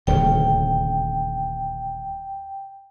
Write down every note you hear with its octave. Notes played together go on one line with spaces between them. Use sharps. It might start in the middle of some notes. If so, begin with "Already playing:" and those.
D#1 D2 C#3 G5